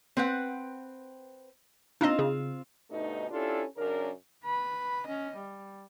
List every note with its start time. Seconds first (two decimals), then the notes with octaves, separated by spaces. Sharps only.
0.17 C4 B4 F#5
2.01 C4 D4 D#4 F4 D#5
2.19 C#3 G#4
2.91 D2 G2 B2 A3 D#4
3.31 C#4 D4 E4 F4 G4 A4
3.77 F#2 C#3 D4 A#4
4.45 B4 B5
5.06 C#4 D#5
5.36 G3